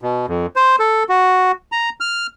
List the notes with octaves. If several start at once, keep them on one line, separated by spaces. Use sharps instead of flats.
B2
F2
C5
A4
F#4
A#5
F6